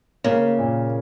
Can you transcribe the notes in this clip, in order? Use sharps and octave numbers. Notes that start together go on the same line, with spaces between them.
C#3 A#3
A#2